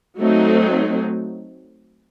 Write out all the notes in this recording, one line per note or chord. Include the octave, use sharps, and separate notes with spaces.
F#3 A3 C4 D#4